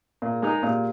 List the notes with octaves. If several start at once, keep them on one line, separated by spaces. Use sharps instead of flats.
A#2 A#4
G#4
G#3 D#4 A#4
G#4
A#2 G4